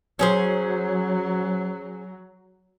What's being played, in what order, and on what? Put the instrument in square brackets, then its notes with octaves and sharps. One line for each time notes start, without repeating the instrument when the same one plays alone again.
[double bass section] F#3 [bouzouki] C#4 G#4 C5